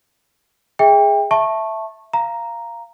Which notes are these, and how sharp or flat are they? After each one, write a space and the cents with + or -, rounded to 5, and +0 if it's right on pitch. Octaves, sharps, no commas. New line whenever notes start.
G#4 +0 E5 -25 G5 +30
E5 +0 A5 +0 C#6 -20
F5 -15 A#5 +0